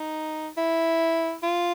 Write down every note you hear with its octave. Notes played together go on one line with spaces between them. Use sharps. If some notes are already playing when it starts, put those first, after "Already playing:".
Already playing: D#4
E4
F4